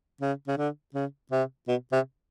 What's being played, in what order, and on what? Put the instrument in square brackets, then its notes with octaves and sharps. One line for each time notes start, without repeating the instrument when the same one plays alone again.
[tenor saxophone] C#3
C#3
D3
C#3
C3
B2
C3